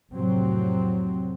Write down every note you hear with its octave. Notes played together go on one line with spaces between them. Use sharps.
F1 A2 C3 F#3 C4